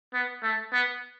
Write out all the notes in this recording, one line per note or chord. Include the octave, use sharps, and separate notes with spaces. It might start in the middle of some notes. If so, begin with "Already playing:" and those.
B3
A3
B3